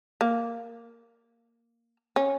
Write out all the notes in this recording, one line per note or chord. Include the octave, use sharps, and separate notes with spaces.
A#3
C#4